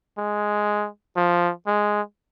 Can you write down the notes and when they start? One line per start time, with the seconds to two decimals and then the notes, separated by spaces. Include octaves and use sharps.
0.18 G#3
1.17 F3
1.67 G#3